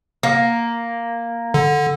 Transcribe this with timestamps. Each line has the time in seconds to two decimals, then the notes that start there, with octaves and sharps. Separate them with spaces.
0.23 A#3
1.54 D3